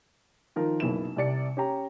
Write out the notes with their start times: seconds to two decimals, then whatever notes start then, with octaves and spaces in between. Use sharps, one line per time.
0.56 D#3 F3 A#4
0.80 F#1 B1 E4 E7
1.16 C2 C3 D5 C#7
1.57 C#4 G4 A#5